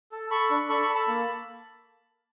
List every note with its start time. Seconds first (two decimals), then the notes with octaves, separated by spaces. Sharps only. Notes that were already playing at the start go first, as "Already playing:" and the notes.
0.12 A4
0.31 A4 B5 C#6
0.51 D4
0.69 A4 B5 C#6
0.82 B5 C#6
0.89 A4
0.95 A5 B5
1.08 A#3